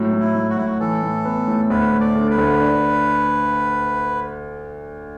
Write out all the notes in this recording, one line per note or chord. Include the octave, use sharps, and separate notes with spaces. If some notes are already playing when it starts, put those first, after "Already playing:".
Already playing: A2 F#3
A2
E4
A2
F#4
A2 E4
F#4
E3 A4
A2
B3
A2
D2 B4
A3
D5
D3
B4
D2
D4